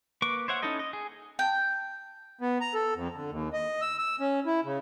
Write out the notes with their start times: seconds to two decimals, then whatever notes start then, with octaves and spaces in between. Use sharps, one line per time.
0.22 A#3 B4 C#6 D6
0.48 C5 C#5 E5 F#5
0.62 C#4 D#4 E4 A4 D#5
0.79 D#5
0.93 G#4
1.39 G5
2.41 B3
2.61 A#5
2.74 A4
2.95 F2
3.15 D3
3.31 D#2
3.53 D#5
3.81 E6
3.98 E6
4.20 C#4
4.46 E4
4.64 C#3